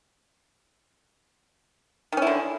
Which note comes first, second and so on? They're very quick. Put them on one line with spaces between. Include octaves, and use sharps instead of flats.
D#3 C#4 E4 D3